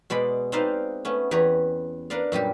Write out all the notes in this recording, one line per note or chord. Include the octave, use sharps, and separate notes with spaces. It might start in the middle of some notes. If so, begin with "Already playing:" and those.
B2 G#3 D5 B5
C4 D#4 B4 C5 D5 F5
A3 B3 C#4
E2 G4 B4 C#5 A#5
D4 A#4 B4 D5 F5
F#2 A#2 G3 G4